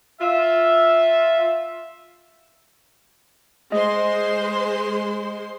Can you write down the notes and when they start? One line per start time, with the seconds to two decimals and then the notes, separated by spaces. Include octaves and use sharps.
0.21 F4 E5
3.72 G#3 C5 D#5 C6